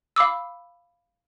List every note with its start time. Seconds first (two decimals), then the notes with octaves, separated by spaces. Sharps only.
0.16 F5 B5 D6 E6